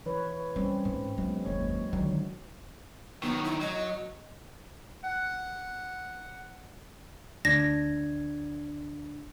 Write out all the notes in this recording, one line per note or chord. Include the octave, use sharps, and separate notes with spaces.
E3 B4 C#5
G3 C4 C#4
G#2
F#3 G#3 B3
F#1 D#2 C#5
D3 D#3 F#3
D#3 F#3 B3
E4
F#3 D#5
F#5
D2 D4 G#6 A#6